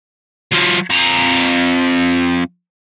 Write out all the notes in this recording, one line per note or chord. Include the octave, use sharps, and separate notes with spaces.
F#3 F4
F2 A#5